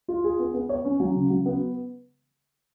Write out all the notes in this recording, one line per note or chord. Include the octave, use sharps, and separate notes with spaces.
F4
G#4
B3
B3
C#5
C#4
F#3
C#3
F#3
B3